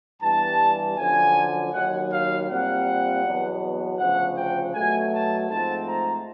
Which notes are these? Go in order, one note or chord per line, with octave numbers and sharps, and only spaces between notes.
G2 E3 G3 B3 A5
F#2 D3 F3 G#5
D#2 D#3 F#3 F#5
F5
A#2 G3 C4 F#5
E2 B2 F#3
D2 C#3 F3 F#5
G5
B2 F#3 A3 G#5
A5
G#2 F3 A3 C4 A5
A#5